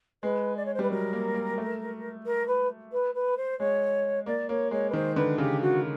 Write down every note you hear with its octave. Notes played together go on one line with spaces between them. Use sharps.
G#3 B4
D5
C#5
C5
G3 B4
F#3 A#4
A#3
A#3
A3
A#4
B4
B4
B4
C5
G#3 C#5
A#3 D5
A#3 C#5
G#3 C#5
B4
D#3 C5
D3 B4
C#3 G4
F#4